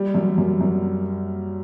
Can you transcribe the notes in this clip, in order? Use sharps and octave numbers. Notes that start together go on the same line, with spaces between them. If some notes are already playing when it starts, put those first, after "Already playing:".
Already playing: G3
F#2
F#2
F#2